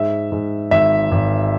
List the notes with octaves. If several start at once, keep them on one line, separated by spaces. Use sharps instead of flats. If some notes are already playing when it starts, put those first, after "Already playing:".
Already playing: G#2 E5
G#2
G#1 E5
G#1